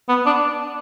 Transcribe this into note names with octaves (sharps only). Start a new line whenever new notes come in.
B3
D4